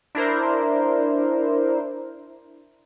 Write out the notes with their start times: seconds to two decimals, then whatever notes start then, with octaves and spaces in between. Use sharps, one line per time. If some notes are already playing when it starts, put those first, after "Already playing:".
0.15 D4 E4 A#4 C5